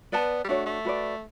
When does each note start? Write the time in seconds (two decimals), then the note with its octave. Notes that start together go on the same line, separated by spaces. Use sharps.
0.12 B3 B4 D5 A5
0.44 G3
0.48 A3 D4 F#4 C#5
0.66 A3
0.85 F#4 B4 D5